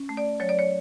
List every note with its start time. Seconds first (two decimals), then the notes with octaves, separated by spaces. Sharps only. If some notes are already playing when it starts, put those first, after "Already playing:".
Already playing: C#4
0.09 A3
0.17 D5
0.40 F#3 C#5
0.49 D5
0.59 C#5